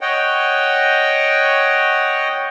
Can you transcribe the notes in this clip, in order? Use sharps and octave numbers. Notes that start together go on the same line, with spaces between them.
C#5 D#5 F#5 G5